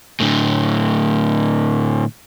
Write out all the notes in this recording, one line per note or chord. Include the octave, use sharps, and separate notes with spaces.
A2 D3